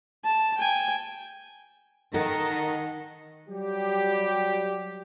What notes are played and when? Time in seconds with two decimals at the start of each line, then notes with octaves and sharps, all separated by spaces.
0.24 A5
0.58 G5 G#5
2.14 D#3 A4 A#4 D#5 F#5
3.48 F#3 G3 G4